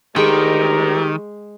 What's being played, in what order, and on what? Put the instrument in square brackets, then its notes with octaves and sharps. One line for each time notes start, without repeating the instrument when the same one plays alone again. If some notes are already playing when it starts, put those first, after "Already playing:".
[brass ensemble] D2 A#4 [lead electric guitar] D#3 [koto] G#3 G5 [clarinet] G4